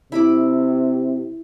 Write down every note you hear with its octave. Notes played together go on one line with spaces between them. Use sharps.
C3 E4 B5 D6